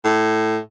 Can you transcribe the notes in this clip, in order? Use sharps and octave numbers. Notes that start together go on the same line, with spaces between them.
A2